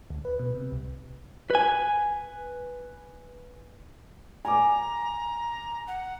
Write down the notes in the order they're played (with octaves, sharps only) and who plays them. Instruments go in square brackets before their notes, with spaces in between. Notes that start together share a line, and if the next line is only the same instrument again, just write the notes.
[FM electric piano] D2
B4
B2
C3
C2
[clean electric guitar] B4 G#5
[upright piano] G#5 D6 [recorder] A#5
[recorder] F#5